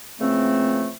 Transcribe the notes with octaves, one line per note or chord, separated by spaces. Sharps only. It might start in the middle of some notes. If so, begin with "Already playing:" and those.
C#3 E3 F3 A3 A#3 C4